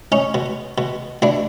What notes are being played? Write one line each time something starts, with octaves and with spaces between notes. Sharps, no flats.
C#4 D#4
B2
B2
B2 D4 E4